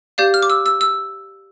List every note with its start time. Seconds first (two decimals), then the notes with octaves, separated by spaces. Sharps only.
0.18 G4 D5 F5 G6
0.34 F6
0.43 D6
0.50 E6
0.66 E6
0.81 E6